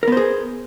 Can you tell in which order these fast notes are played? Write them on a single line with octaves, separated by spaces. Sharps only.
A#4 B3 C5 G#4